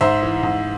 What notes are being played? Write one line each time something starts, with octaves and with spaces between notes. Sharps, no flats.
G#2 C5 E5
E3
G#2